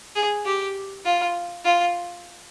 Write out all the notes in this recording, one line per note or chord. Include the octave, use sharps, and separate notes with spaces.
G#4
G4
F4
F4